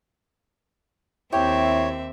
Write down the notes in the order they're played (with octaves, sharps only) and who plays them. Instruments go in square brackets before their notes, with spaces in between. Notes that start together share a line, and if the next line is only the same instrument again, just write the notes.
[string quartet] D#2 C4 E5 [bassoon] E4 [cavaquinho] G4 [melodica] C#5